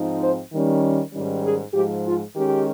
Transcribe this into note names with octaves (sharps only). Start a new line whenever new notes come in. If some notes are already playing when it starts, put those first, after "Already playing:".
Already playing: G#2 F3 C4 D#4
C5
D#3 G3 C#4
G#2 D#3 G3 C#4
G#4
G#2 F3 G#3 G4
F4
D#3 G#3 C#4 G4